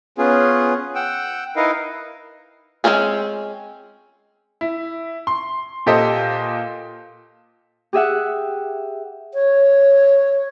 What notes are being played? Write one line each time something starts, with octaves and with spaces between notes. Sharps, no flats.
B3 C#4 F4 G#4
F#5 G5 E6
D#4 E4 A#4 B4 D#5 F5
G#3 A#3 C4 C#4 G#4
E4
C6
A#2 G4 A4 C5 D#5
G4 G#4 E5 F#5
C#5